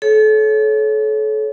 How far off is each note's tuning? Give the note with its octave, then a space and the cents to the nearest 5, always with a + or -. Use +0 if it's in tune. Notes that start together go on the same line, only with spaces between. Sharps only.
A4 -35 C#5 +0